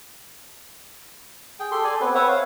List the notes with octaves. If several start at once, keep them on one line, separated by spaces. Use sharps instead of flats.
G#4 G5
G4 A4 C6
A4 D5 G#5
B3 C4 B4
B4 C#5 E5 F#5
F5